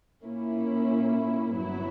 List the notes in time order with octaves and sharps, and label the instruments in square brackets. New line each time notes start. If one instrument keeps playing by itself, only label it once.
[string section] A#2 A#3 C#4 E4
G1 G2 F#3 B3 E4